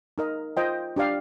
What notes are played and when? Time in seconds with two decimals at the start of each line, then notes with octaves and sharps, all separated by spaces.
0.18 D#4 A#4 D#5
0.57 F4 C5 D#5 G5
0.96 D4 G4 D5 F5